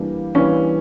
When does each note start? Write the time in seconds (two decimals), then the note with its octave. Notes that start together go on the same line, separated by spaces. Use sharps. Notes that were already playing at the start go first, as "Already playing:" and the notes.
Already playing: E3 G3 A#3 D4
0.35 E3 G3 A#3 C#4 D4